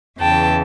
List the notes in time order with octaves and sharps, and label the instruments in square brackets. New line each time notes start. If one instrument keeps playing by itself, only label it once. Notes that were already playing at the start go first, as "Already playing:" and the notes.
[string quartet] E2 C#3 E3 G5 A5